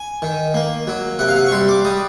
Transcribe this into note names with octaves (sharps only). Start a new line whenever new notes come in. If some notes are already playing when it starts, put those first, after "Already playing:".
Already playing: G#5
D#3
A#3
F#3
C3 F#5
F5
F#5
C#6
G3 C6
D6
G3 D#6